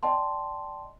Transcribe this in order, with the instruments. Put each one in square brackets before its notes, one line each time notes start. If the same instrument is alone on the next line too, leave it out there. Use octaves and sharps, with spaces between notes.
[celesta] D5 D#5 G5 A5 C6